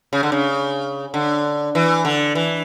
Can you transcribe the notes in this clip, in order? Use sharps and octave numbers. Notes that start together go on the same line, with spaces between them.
C#3
D3
C#3
D3
E3
D3
E3